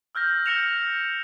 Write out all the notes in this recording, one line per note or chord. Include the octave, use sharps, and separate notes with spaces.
E6 F6 G6 A#6
F6 G6 A#6 C#7 E7 F7